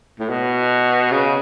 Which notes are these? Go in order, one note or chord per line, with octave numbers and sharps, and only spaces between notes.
A2
B2
C#3